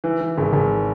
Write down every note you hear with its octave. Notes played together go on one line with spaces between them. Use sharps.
E3
E3
G#1
G#1